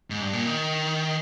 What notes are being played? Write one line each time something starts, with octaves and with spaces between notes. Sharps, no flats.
G#2
G2
A#2
D#3